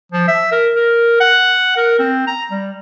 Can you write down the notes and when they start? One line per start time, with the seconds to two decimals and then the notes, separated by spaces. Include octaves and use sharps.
0.12 F3
0.28 E5
0.52 A#4
0.76 A#4
1.20 F#5
1.77 A#4
1.99 C4
2.27 A#5
2.51 G3